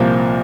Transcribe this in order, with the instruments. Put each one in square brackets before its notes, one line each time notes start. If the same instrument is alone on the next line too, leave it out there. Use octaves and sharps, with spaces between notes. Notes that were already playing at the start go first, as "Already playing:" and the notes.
Already playing: [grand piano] C2 A#2 F3 A#3 G6